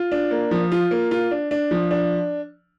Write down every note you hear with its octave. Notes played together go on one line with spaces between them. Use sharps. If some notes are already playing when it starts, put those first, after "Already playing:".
Already playing: F4
D4
A#3
F3
F4
A#3
F4
D4
D4
F3
D4